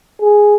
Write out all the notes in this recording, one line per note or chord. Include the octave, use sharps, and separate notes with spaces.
G#4